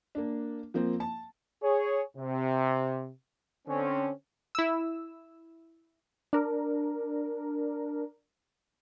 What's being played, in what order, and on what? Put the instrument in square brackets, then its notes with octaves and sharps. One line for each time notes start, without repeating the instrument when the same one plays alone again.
[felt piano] A#3 D4
F3 A#3 C4
A5
[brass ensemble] G#4 C#5
C3
D3 C4 C#4
[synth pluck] E4 E6
[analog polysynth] D4 A#4